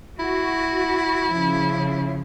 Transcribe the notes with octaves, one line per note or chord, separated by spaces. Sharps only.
E4 F#4
C#3 F3